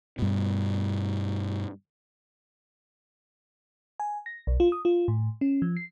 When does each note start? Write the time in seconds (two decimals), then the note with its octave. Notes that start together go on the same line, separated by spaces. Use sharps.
0.19 G2 B2
4.00 G#5
4.26 A#6
4.47 B1
4.60 F4
4.72 D#6
4.85 F4
5.08 A2
5.41 C#4
5.62 F3
5.77 C7